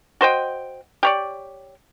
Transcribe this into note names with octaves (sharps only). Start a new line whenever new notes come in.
F#4 C5 D#5 G5
G4 C#5 D5